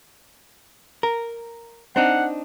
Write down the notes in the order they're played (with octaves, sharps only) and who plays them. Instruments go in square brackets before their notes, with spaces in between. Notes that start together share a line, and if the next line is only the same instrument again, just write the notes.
[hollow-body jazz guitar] A#4
[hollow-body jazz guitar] C4 D4 D#4 [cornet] F#5